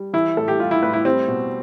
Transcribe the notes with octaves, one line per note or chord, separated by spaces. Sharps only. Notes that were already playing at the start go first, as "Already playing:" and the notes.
Already playing: G3
E3 E4
A2 A4
G4
G3 F4
E4
A2 B4
E4
G3 C4
B2